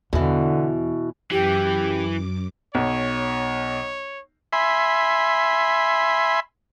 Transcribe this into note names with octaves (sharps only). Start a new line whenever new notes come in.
E2 B2 D3 E3
F#2 E3 G4 D6
B1 C#5
E5 G#5 B5 C6